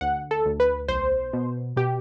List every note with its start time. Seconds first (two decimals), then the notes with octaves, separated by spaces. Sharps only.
0.01 D2 F#5
0.31 A4
0.46 D2
0.60 B4
0.88 B1 C5
1.33 B2
1.76 B2 G4